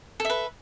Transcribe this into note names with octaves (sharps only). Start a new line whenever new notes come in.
A4 B4 E5